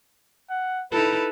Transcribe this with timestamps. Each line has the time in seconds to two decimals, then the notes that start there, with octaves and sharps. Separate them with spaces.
0.50 F#5
0.92 D#4 E4 A4 B4